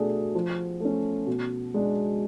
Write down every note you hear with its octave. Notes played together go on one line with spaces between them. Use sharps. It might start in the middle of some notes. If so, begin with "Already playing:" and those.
Already playing: B2 A3 D4 G#4
F3
A3 C#4
B2
G#3 D4